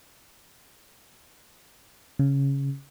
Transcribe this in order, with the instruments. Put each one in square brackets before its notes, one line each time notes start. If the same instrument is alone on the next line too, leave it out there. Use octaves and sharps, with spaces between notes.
[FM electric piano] C#3